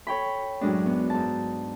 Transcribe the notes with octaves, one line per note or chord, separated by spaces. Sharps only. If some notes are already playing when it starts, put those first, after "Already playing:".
A4 C#5 G5 B5
F#2 A2 G#3 D4
B3
G#2 A5